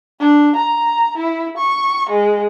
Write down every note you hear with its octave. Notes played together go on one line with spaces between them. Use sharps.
D4
A#5
E4
C#6
G#3